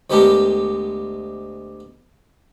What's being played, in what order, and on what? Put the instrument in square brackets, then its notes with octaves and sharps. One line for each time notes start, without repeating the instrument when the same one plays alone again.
[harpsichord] D2 G#3 B3 G4 A4 A#4